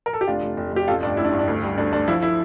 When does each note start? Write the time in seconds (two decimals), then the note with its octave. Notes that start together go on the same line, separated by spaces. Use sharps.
0.06 A#4
0.13 A4
0.21 G4
0.28 F1 D4 F4
0.42 F1
0.57 F1
0.72 F1 G4
0.88 A1 F4 A4
1.03 G2 D4
1.17 A1 E4
1.25 D4
1.32 G2
1.39 D4
1.48 D2
1.63 G3
1.78 D2 D4
1.92 D2 D4
2.08 F3 E4
2.22 E4